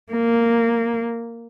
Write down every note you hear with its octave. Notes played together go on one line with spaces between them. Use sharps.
A#3